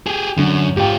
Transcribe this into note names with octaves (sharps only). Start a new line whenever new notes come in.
G4 G#4
F#2 D3
G#2 F4 G4 G5